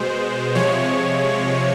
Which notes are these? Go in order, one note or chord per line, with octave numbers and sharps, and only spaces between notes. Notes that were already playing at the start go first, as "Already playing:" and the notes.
Already playing: B2 G#3 C5
C3 F3 G#3 C#5